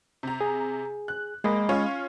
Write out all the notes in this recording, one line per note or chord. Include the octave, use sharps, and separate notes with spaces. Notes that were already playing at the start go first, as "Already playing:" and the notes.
C3 A#5
G#4
F#6
G#3 A#3 D#5 B5
C#4 F4 C#5